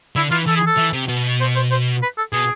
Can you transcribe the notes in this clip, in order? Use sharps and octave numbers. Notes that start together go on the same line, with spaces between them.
D3 E4
E3 F4
E3 A4
G#4
A4
E3
C3
B2
C5
C5
C5
B4
A4
B2 G#4